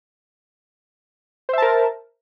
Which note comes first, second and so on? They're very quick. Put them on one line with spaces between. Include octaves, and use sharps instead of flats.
C5 E5 A5 A#4